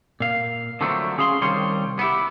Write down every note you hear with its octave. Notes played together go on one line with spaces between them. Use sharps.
A#2 F5
D3 F3 F#3 A3 C4 D4
C#4 G#4 F5 A#5 C6
C2 D#3 G3 C#5 F5 C6
B3 E4 G4